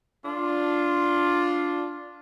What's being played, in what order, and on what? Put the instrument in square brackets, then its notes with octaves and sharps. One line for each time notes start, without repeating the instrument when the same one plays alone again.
[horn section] D4 F4